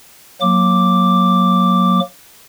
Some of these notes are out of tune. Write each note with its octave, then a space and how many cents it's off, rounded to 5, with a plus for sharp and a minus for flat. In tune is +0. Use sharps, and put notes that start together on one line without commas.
F#3 -20 A#3 +0 D6 +0